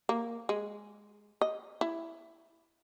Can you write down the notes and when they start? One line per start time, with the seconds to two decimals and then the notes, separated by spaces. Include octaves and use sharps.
0.09 A#3
0.49 G#3
1.41 D#5
1.81 E4